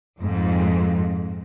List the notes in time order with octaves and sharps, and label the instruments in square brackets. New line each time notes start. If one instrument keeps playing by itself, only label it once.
[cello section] F2 G#2